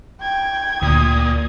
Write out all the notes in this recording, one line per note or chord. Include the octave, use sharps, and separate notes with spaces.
G5 G#6
D2 A#2 D#6